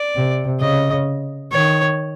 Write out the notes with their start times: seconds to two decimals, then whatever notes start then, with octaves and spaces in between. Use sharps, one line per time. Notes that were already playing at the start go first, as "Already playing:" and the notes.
Already playing: D5
0.15 C3
0.60 C#3 D#5
1.51 D#3 C#5